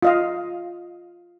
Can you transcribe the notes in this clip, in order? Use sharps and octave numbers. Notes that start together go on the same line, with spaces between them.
F4 D#5 F5